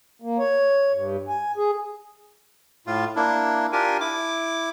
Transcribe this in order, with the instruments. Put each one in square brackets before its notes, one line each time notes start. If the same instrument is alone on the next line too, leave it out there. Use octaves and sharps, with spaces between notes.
[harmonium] A#3
C#5
G2
G#5
G#4
[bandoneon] A2 F4
A#3 D4 E4
D4 F4 G4 A#4 G#5
E4 D6